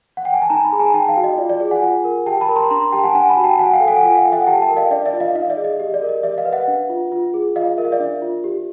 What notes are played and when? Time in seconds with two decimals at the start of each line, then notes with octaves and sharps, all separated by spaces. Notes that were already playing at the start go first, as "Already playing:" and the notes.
0.17 F#5
0.25 G5
0.34 G#5
0.42 A5
0.50 D#4 G#5 A#5
0.64 A5 B5
0.72 G#4
0.79 G#5 A#5
0.94 D#4 G5 A5
1.09 F5 G5
1.17 F#4
1.24 D#5
1.38 F4 D5
1.50 D5
1.60 G#4 D5
1.71 F#5 G#5
1.82 F4
2.04 A#4
2.26 G4 G5 A5
2.41 A5 B5
2.49 A#4
2.56 A#5 C6
2.70 D4 A#5 C6
2.92 G4 G5 A5
3.03 F#5 G#5
3.15 D4 F#5 G#5
3.29 A5 B5
3.37 F#4
3.44 G5 A5
3.59 F#4 F#5 G#5
3.73 F5 G5
3.80 A4
3.88 F#5 G#5
4.03 F4 F#5 G#5
4.18 F5 G5
4.25 A4
4.32 E5 F#5
4.47 G4 G5 A5
4.62 G5 A5
4.69 A#4
4.77 D#5 F5
4.91 D4 D5 E5
5.06 D5 E5
5.13 F4
5.20 D#5 F5
5.35 D#4 D#5 F5
5.50 D5 E5
5.57 G#4
5.64 D#5
5.79 G4 D#5
5.94 D5
6.02 A#4
6.09 D#5
6.23 G4 D5 E5
6.38 D#5 F5
6.45 B4
6.52 E5 F#5
6.68 D4
6.90 F4
7.12 F4
7.34 G#4
7.56 F4 D#5 F5
7.78 A#4 E5
7.85 F5
7.92 D5 E5
8.00 D4
8.22 F4
8.44 G4